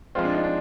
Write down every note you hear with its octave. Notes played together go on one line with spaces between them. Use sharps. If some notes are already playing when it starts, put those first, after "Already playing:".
F3 G#3 C4 F4
D4
D#4
D4